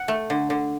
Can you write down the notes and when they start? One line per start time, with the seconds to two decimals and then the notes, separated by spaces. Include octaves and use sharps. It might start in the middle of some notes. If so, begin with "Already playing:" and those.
Already playing: F#5
0.08 A3
0.30 D3
0.50 D3